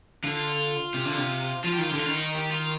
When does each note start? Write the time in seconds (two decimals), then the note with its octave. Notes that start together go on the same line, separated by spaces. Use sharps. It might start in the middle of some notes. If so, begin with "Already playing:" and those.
0.24 D3 F4
0.94 C3
1.05 D3
1.17 C3
1.64 F3 F4
1.73 G4
1.78 D#3 F4
1.90 D3 G4
1.99 F4
2.06 D#3
2.16 D#4
2.34 G4
2.51 F4